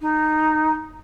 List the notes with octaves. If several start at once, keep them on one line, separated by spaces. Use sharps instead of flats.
D#4